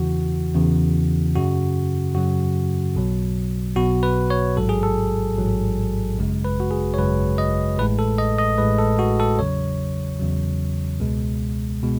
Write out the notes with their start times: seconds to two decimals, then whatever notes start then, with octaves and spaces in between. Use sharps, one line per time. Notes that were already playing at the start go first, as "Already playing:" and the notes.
Already playing: E2 C#3 E3 F#4
0.55 E2 C#3 E3
1.36 F#2 C#3 F#3 F#4
2.15 F#2 C#3 F#3 F#4
2.95 B1 B2 F#3
3.76 B1 B2 F#3 F#4
4.03 B4
4.30 C#5
4.57 A1 G#2 F#3 A4
4.69 G#4
4.83 A4
5.37 A1 G#2 F#3
6.17 G#1 F#2 C#3 G#3
6.45 B4
6.60 F#4
6.71 G#4
6.94 C#5
6.98 G#1 F#2 C#3 G#3 B4
7.38 D#5
7.78 A1 A2 G#3 B4
7.99 A4
8.18 D#5
8.38 D#5
8.58 A1 A2 G#3 B4
8.79 A4
8.99 F#4
9.20 A4
9.39 E2 C#3 F#3 C#5
10.19 E2 C#3 F#3
11.00 C#2 B2 G#3
11.82 B2 G#3